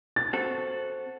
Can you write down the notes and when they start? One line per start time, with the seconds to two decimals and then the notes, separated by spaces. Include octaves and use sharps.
0.16 A6
0.33 C4 F#4 A4